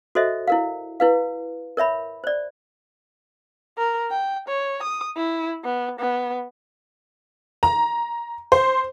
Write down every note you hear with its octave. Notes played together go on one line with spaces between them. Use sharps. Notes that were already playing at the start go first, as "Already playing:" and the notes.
F#4 A4 C5 D#5 E5
E4 A#4 F5
E4 B4 F5
A#4 C#5 E5 B5
C5 D5
A#4
G5
C#5
D#6
E4
B3
B3
A#5
C5